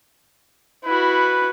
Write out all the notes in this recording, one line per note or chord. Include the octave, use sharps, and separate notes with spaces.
E4 F#4 B4